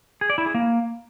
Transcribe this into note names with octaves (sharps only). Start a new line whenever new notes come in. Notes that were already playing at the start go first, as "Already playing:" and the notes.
G#4
D5
E4
G#4
A#3